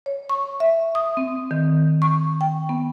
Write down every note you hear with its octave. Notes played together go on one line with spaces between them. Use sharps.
C#5
C#6
E5
D#6
C4
D#3
C#6
G5
B3